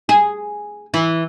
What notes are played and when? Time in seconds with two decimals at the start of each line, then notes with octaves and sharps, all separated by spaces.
0.09 G#4
0.94 E3